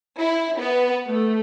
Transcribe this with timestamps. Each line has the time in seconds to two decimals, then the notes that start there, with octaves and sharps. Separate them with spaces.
0.19 E4
0.59 B3
1.07 A3